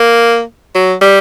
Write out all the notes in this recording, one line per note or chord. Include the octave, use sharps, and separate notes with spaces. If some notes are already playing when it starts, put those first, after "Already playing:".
Already playing: A#3
F#3
G3